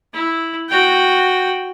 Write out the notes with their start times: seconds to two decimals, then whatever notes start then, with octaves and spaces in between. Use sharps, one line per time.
0.13 E4
0.69 F#4 G5